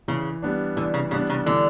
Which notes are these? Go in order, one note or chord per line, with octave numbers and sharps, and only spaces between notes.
C#3 E3
G3 B3 D4
D3 E3
C#3
C#3 G3 B3 D4
C#3
D3 E3